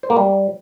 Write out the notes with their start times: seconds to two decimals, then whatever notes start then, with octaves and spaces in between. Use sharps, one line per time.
0.03 C5
0.10 A#3
0.17 G3